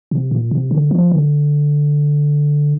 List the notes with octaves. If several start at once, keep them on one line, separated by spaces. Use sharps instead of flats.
C3
A#2
C3
D3
F3
D3